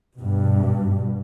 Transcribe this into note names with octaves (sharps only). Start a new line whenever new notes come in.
G2 B2